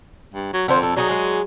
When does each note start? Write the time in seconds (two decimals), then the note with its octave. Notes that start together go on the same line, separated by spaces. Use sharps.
0.34 G2
0.53 F#3
0.68 F2 D3 C5
0.83 A4
0.96 F#3 D4 D#4 G#4
1.09 G#3 G#4